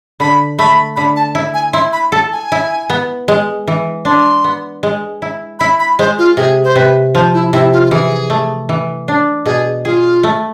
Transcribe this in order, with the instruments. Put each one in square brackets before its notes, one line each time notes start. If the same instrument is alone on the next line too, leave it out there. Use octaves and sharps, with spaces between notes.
[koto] D3 [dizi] B5
[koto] A3 [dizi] B5
[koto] D3 [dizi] B5
[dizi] A5
[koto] E4
[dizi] G#5
[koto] E4 [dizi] C6
[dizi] B5
[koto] A4 [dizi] A5
[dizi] G#5
[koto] E4
B3
G#3
E3
[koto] D4 [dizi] C6
[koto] B3
G#3
E4
[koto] E4 [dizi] B5
[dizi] B5
[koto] G#3 [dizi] C5
[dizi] F4
[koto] C3 [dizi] G#4
[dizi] C5
[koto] C3 [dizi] B4
[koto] F3 [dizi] C5
[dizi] E4
[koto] C3 [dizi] E4
[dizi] F4
F4
[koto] E3 [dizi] G#4
[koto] A3
E3
D4
[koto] B2 [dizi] G#4
[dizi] F4 [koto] G#4
[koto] A3